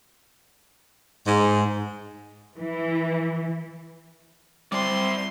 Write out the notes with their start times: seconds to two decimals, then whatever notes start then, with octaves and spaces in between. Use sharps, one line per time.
1.27 G#2
2.57 E3
4.72 G3 C4 E4 D5 C6